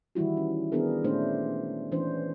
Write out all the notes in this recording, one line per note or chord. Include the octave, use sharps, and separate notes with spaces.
D#3 E3 G3 E4 F#4
C#4
D#3 B3 D4 G#4 A#4
A#2 G#3 A3 C#4 D4 C5
E3 G#3 C#4 D4 C5